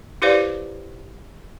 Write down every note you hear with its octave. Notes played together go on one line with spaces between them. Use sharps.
E4 G4 B4 C5 D5 F5